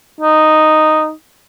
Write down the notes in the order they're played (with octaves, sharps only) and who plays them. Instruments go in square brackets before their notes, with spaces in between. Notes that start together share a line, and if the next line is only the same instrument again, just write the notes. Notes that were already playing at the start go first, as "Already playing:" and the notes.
[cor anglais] D#4